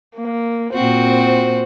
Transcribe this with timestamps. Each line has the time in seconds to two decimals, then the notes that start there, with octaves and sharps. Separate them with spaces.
0.16 A#3
0.74 A#2 C4 F#4 C5